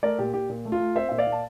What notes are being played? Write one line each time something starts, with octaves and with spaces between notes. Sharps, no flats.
A3 A#4 D5
A#2 G4
A#2 G4
A#2
A3
F4
A3
C4 C5 E5
A#2 E5
D5 F5
A#2
A5